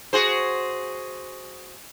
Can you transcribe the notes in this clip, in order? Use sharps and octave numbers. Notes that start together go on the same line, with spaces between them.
F#4 G#4 C5